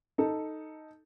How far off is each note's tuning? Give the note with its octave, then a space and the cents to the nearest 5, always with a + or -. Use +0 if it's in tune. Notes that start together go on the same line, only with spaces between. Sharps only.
D#4 +0 A4 +0